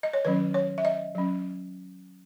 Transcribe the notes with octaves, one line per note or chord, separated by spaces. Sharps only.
D#5
C#5
D#3 F#3 C#4 B4
C#5
E5
D#5
F#3 C#4